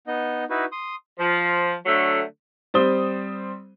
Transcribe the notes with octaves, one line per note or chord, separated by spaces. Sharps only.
B3 D#4 D#5
D#4 E4 F#4 B4
C6 D#6
F3
D3 F#3 A3
G3 C4 C5 D#6 G7